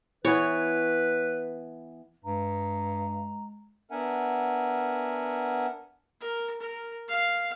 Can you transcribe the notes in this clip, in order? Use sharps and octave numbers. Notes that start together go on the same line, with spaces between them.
E3 B3 B4 C#5
G2 G#3 A#5
B3 D4 A#4 E5 F#5 G#5
A#4
A#4
F5